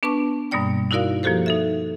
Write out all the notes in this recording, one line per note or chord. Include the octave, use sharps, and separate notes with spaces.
B3 D4 B4 A5 C#6 D6
G2 B2 G3 A#3 D5 G5
D#4 E4 F#4 A#4 D5 F5
F3 A#3 F#4 G4 A4 C5
D#4 A4 E5